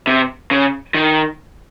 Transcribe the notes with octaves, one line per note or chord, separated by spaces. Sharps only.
C3
C#3
D#3